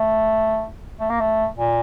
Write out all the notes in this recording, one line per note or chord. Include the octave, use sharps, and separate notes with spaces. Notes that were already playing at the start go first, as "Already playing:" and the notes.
Already playing: A3
A3
A#3
A3
A#2